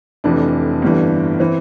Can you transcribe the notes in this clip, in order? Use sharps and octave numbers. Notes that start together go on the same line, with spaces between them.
F1 F2 E3 D4
G1 G2 E3
E3 C4